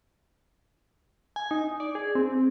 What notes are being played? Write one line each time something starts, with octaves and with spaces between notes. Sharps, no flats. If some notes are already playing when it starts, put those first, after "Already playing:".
G#5
D#4
D5
G#4
C4